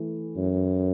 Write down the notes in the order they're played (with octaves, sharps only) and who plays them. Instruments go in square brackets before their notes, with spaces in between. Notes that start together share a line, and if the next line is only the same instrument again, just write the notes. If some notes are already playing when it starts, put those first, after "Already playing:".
Already playing: [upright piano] E3 A3 E4
[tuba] F#2